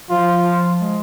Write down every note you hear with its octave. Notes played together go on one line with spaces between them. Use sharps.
F3 F4
G#3